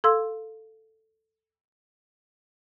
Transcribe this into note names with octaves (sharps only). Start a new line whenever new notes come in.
A4 F5 C6 E6